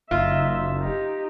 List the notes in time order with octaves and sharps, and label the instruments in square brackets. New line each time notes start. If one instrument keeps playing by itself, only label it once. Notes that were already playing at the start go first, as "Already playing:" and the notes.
[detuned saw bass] F#1 [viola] D#4 E5 [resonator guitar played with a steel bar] F4
[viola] D#4 G4